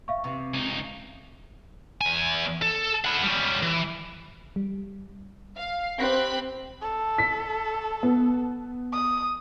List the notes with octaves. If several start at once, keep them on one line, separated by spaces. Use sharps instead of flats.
E5 F5 C#6
C3 E3
C#2 D#4
G2
E2 G#5
A4
E4 F#5
G3 C#4
E3
G3
F5
C4 G4 B5 F#6
A4
B6
B3
D#6